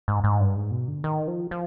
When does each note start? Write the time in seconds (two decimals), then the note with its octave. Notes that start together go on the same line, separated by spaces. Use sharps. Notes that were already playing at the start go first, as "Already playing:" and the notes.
0.08 G#2
0.24 G#2
0.40 G2
0.56 G#2
0.71 B2
0.88 D3
1.04 D#3
1.27 F3
1.51 F3